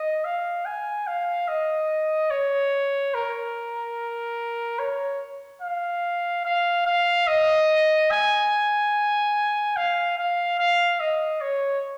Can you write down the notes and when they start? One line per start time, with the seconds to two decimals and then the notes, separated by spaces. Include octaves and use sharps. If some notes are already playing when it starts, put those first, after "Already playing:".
Already playing: D#5
0.25 F5
0.66 G#5
1.07 F5
1.48 D#5
2.31 C#5
3.14 A#4
4.79 C#5
5.62 F5
6.45 F5
6.86 F5
7.27 D#5
8.11 G#5
9.76 F5
10.17 F5
10.59 F5
11.00 D#5
11.41 C#5